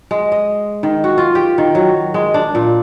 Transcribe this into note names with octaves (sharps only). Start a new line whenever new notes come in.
G#3
D#5
D#3
F#4
F4
G4
D#3
F#3
G#3
D4
A#2